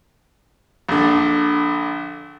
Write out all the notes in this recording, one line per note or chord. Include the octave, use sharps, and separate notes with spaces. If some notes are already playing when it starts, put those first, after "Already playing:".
A#1 D3